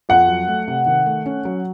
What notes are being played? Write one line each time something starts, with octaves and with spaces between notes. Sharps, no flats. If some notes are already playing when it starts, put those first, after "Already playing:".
F2 F#5
F#3
A3
C3
D#3
A3
C#4
F#3